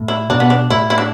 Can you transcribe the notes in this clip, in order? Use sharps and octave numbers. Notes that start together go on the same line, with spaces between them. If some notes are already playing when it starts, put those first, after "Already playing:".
Already playing: A2
E4
B2 D4
B3
D4
A2 E4
E4
D4